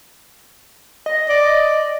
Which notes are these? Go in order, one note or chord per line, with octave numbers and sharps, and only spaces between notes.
D#5
D5